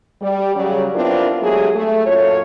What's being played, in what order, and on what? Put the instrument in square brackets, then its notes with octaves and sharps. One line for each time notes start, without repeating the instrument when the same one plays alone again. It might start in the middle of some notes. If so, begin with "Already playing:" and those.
[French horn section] G3
C#3 F#3 G3
B3 C4 D4 E4 F4 A#4
F#3 G#3 A3 G4 G#4
A3
F#2 A#2 F4 A4 C#5